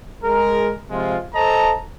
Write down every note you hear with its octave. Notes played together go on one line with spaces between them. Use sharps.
G#3 G#4 A#4
C3 F3 G#3 F4
A4 C5 D#5 A5 A#5